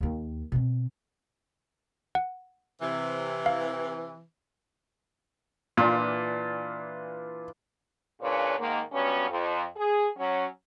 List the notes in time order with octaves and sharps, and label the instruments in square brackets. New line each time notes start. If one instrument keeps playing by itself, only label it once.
[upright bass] D#2 D#3
B2 C4
[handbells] F#5
[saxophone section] C3 E3
[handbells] F5
[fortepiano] A#2 [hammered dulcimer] E3 D4 F4
[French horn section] A#2 C#3 D4 B4 C#5
G#2 D#3 A#3
G2 F#3 B3 C#4
F2
G#4
F#3 C#4